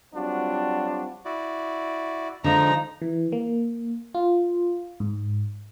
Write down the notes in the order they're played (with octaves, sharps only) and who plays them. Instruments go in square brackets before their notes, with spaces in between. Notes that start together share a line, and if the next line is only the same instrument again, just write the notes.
[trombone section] F#3 G3 C4 D4 F4 F#4
[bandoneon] E4 F#4 D5
[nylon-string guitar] D3 G#3 [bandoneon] F3 D#4 [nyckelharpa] A#5
[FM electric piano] E3
A#3
F4
G#2